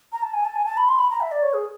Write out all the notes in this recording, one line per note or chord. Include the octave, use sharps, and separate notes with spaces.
A#5
A5
G#5
A5
G#5
A5
B5
C6
B5
A#5
E5
D5
C#5
G#4